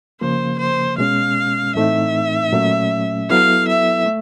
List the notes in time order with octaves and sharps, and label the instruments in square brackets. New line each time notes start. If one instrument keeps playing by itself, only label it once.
[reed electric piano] C#3 F3 A#3 [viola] C5
[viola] C5
[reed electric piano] B2 G#3 C#4 [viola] F5
[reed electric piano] A2 E3 A3 C4 D#4 [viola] E5
[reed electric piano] A#2 F#3 A3 C#4
[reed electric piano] F#3 B3 E4 A4 [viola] F5
[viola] E5
[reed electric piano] A3